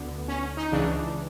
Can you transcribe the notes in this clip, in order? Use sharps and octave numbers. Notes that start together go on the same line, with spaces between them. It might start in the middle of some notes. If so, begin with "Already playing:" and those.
Already playing: D2 D3 B3
C#4
D#4
C#2 C#3 E3 D4